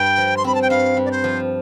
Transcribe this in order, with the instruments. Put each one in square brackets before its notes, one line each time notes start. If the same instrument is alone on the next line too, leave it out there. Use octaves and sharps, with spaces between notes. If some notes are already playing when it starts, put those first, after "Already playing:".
Already playing: [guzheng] G2 [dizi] G5
[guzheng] F3
[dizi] C6
[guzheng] C4 [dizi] B5
[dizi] A5
G5
[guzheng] G2 [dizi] F5
[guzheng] G2
[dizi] D5
C5
[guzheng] F3